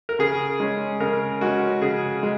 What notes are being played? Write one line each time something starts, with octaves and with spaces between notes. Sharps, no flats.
A#4
C#3 G#4
G#3 C#4
C#3 A#4
G#3 C#4 F#4
C#3 G#4
G#3